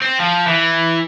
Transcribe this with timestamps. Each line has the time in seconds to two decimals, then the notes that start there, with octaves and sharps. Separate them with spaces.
0.02 C4
0.20 F3
0.47 E3